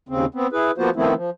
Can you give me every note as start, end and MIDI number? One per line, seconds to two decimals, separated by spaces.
0.09 0.26 39
0.09 0.26 49
0.09 0.26 60
0.35 0.47 59
0.35 0.47 60
0.53 0.71 64
0.53 0.71 68
0.53 0.71 71
0.78 0.90 53
0.78 0.90 58
0.78 0.90 59
0.78 0.90 65
0.78 0.90 66
0.78 0.90 72
0.96 1.14 51
0.96 1.14 53
0.96 1.14 57
0.96 1.14 59
0.96 1.14 60
0.96 1.14 64
1.15 1.30 53